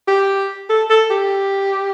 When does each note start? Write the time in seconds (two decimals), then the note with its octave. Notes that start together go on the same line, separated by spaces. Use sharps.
0.08 G4
0.69 A4
0.90 A4
1.11 G4